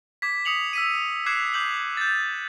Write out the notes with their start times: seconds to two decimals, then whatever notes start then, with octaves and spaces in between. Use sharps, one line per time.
0.22 D6 G#6 B6
0.45 D#6 B6 C#7 F7 F#7
0.73 E6 B6 D#7
1.26 D6 F#6 G#6 C7 C#7 E7
1.54 D6 G6 C7 F#7
1.97 G6 A6